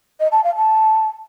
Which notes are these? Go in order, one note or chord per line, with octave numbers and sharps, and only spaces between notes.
D#5
A5
F5
A5